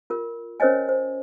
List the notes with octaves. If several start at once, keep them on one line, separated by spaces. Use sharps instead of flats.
F4 A#4
C#4 A#4 C5 C#5 D#5 G#5
C5